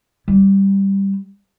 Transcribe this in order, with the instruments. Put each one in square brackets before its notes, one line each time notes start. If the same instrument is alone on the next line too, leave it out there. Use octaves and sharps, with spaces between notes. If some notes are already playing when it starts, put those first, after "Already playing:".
[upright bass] G3